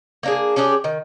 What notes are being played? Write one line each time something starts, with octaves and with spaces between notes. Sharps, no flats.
A#3 D4 G#4
C#4 D4 G4 G#4
D#3